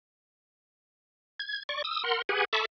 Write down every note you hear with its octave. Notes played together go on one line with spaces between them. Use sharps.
G#6
D5 C#6
D#6 E6
A#4 F#5 C6
G4 G#4 B4 F#5 G#5
A4 E5 A5 B5 C#6 D6